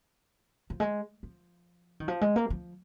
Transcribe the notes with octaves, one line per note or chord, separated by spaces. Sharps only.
F3
G#3
F3
D#3
F3
G#3
A#3
F3